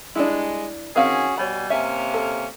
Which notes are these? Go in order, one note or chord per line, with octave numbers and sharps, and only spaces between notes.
G3 G#3 D4 E4
D#3 C4 C#4 F#4 G#4 F5
B2 G3 C#5 G#5 B5
C3 A#3 C#4 E5 G#5
A4